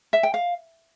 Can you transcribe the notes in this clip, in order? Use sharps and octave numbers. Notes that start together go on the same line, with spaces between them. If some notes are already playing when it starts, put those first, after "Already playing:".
E5
G5
F5